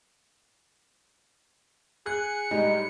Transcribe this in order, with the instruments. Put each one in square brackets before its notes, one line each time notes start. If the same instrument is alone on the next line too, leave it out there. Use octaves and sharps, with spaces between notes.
[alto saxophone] G#4 [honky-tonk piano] F#6 [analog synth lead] C#7
[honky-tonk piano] A2 G3 G#3 [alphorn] D#4